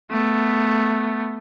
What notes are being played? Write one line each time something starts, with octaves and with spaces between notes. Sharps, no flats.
A3 B3